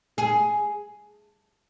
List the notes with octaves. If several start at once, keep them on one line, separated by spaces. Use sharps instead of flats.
G#4